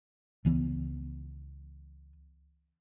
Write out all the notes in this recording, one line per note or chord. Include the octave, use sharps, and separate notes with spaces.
C#2 E3 B3